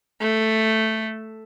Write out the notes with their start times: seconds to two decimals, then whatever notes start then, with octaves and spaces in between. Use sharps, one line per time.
0.21 A3